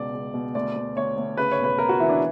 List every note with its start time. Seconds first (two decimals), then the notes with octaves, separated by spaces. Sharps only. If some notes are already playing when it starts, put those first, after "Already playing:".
Already playing: C#2 B2 D5
0.14 C#2
0.34 B2
0.55 D2 D5
0.75 D2
0.96 D2 C#5
1.17 D2
1.37 C#3 B4
1.52 C#5
1.59 E1
1.64 B4
1.78 E1 A#4
1.89 F#4
2.00 E3 E4
2.09 D4